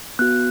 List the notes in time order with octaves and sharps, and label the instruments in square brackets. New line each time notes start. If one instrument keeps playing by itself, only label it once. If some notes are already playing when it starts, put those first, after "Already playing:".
[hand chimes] B3 F#4 F#6